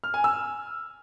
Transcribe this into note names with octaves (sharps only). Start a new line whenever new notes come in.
F6
G#5
E6